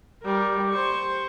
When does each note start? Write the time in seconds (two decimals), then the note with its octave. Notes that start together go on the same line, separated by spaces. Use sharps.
0.23 G3 A#4
0.71 C5 C#6